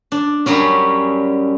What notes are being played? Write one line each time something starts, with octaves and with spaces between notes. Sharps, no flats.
D4
F#2 F#3 G3 C#4